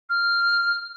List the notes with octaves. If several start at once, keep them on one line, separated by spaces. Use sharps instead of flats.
F6